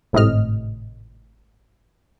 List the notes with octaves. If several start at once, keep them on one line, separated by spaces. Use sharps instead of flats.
G#1 A2 C3 D#5 F6